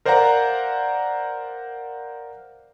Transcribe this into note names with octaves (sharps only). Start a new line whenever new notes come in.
A#4 C5 D5 F5 F#5 A#5